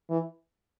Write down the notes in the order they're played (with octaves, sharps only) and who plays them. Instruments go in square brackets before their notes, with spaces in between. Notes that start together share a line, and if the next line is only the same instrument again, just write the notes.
[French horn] E3